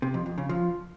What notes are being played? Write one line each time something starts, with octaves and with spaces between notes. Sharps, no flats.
C3
F2
F2
C#3
F3